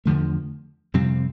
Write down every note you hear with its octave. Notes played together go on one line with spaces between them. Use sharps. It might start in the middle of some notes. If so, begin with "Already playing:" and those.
E2 D3 F3 A3
F2 C3 G3 C4